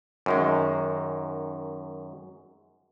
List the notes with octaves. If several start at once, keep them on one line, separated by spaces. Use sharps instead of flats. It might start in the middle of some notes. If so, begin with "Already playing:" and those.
F#2 D#3 G#3